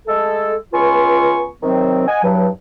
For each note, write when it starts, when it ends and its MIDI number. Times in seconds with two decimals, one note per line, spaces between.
0.07 0.55 56
0.07 0.55 57
0.07 0.55 69
0.73 1.47 37
0.73 1.47 59
0.73 1.47 65
0.73 1.47 80
0.73 1.47 85
1.62 2.06 48
1.62 2.06 51
1.62 2.06 54
1.62 2.06 60
2.07 2.20 75
2.07 2.20 78
2.07 2.20 80
2.23 2.47 40
2.23 2.47 43
2.23 2.47 54